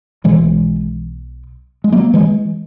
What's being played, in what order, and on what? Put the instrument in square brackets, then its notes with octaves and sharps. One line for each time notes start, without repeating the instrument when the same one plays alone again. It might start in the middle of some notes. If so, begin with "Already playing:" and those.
[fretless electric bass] B1 B2 E3 G#3
G#3
F#3 A#3
E3 G#3